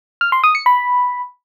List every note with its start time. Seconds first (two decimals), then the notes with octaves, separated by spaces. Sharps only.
0.21 F6
0.32 C6
0.44 D#6
0.55 C#7
0.66 B5